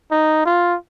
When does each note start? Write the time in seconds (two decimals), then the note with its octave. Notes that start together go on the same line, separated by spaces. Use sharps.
0.11 D#4
0.46 F4